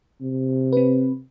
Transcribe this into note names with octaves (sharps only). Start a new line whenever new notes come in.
C3
C4 B4